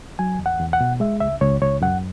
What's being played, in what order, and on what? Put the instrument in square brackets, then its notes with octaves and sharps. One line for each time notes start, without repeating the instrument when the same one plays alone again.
[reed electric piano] F#3 G#5
E2
F#5
E2
F#5
B2
G#3 E5
C#2 E5
C#2 C#5
C#2 C#5
F#2 F#5